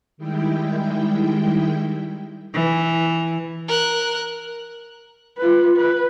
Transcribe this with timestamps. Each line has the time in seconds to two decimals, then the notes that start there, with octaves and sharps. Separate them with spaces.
0.17 D#3 G3 G#3 E4 G5
2.54 E3
3.68 A#4 F#6
5.38 F4 B4
5.76 B4